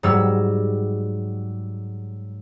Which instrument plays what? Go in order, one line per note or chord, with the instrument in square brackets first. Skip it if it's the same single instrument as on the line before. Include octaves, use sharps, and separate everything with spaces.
[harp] G#2 F#3 G3 E6